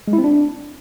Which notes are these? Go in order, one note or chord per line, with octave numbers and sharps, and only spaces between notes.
G#3
E4
C4
D4